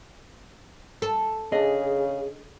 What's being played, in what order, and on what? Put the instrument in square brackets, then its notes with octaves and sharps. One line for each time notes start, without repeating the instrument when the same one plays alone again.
[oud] A4
[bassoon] C#3 [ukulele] D4 D#5 [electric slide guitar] G#4